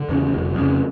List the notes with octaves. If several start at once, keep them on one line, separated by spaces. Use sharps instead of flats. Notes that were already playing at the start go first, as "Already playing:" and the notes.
Already playing: D3
E2 C#3
F1
F2 C#3